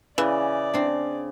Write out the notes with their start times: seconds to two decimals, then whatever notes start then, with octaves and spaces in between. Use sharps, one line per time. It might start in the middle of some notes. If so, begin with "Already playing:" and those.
0.18 C#3 E3 D5
0.74 C4 D4